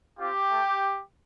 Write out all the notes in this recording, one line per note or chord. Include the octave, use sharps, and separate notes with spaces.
C4 F4 G4
A3